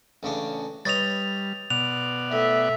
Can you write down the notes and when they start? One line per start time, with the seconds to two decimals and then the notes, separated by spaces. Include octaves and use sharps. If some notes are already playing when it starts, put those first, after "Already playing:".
0.23 A1 C#3 D4
0.85 G3 B4 C#5 D#5 A6 F7
1.70 B2 D5 F#5 F7
2.32 A2 E5